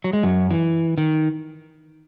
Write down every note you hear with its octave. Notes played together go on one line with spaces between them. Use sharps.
F#3
G#3
F#2 F#3
E3
D#3